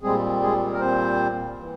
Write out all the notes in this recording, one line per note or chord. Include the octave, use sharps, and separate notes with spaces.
A#2 G3 G#3 C4 G#4
G#3 G#4
A#4
C4 C5
E3